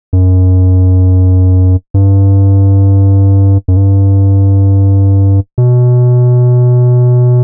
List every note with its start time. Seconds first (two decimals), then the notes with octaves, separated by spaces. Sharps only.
0.13 F#2
1.94 G2
3.68 F#2
3.77 G2
5.58 B2